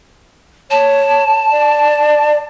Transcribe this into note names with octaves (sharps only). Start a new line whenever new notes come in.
C#5 A5
D5